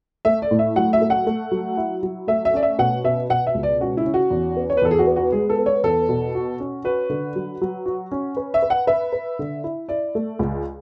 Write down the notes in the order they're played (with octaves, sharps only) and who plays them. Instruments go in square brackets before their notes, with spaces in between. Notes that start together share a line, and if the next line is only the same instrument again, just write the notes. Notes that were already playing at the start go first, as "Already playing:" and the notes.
[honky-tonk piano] A3 [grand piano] E5
[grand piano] D5
[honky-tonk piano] A2
[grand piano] E5
[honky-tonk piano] F#3 [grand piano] F#5
[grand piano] E5
[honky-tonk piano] A3
[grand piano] F#5
[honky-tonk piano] A3
F#3
E4
F#3
[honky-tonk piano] A3 [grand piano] E5
[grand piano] E5
[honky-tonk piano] C#4 [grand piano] D5
[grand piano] E5
[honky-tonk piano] B2 [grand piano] F#5
[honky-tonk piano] B2 [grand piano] E5
[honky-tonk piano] B2 [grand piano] F#5
[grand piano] E5
[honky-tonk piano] C#2
[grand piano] D5
[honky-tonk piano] C#4 [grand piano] F#4
[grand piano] E4
[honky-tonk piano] C#4
[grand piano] F#4
[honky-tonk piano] E2
B3
[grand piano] C#5
B4
[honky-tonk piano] E2 [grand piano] A4
[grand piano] G#4
F#4
[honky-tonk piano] B3
[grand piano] F#4
[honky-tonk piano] G#3 [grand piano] G#4
[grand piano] A4
[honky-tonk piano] B3
[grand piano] C#5
[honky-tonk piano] E2 [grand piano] A4
[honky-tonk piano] B2
F#4
C#4
[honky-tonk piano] F#4 [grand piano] B4
[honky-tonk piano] D3
F#3
F#3
F#4
C#4
B4
[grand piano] E5
[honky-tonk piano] B4
[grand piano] F#5
[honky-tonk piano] B4 [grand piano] E5
[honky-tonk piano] B4
D3
E4
[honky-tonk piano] E4 [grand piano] D5
[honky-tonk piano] A3
C#2